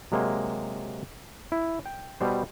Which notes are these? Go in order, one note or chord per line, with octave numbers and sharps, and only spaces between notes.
C3 F#3 G#3 A#3
E4
G5
B2 G3 C5